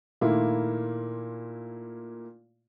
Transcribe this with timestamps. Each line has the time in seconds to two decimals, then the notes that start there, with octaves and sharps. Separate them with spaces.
0.21 A#2 D#3 A3 A#3 E4 F4